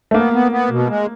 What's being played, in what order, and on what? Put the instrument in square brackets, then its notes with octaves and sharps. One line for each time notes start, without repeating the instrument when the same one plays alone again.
[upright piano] A3
[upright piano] A#3 [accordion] B3
[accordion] B3
B3
B2
G#3